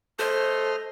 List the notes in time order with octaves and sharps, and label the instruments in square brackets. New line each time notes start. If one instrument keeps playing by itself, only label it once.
[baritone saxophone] A3 [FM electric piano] A4 [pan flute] C5 [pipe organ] D#5 C6 F6